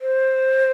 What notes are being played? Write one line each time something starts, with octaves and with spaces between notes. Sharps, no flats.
C5